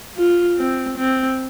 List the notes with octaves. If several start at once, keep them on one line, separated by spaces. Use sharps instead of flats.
F4
C4
C4